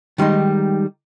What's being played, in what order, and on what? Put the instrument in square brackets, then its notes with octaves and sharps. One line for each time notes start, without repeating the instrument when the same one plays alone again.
[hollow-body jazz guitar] D#3 G3 G#3 D#4